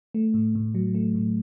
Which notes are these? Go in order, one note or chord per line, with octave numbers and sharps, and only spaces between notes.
A3
A2
A2
F#3
A3
A2